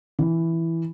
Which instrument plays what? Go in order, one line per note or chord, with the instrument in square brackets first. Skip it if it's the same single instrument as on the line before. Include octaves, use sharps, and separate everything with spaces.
[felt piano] E3